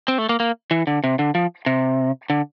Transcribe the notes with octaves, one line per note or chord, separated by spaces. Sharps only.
C4
A3
A#3
A#3
E3
D3
C3
D3
F3
C3
D3